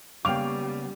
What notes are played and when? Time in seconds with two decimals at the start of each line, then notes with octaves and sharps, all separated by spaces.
0.25 C#3 G3 A#3 B3 F5 G5 D6 F7